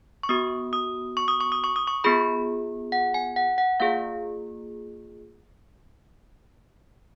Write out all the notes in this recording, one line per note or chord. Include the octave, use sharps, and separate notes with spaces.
C#6
B3 F#4 D#6
D#6
C#6
D#6
C#6
D#6
C#6
D#6
C#6
B3 F4 G#4 B5
F#5
G#5
F#5
F#5
A#3 F4 G#4 F5